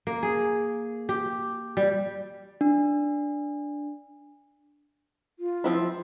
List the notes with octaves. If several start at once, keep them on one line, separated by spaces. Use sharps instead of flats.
A#3
G#4
G4
G3
D4
F4
F3 C4 E4